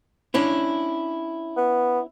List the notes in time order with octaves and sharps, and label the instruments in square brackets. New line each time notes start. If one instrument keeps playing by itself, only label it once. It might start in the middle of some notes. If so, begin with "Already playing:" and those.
[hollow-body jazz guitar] C#4 D4 E4
[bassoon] B3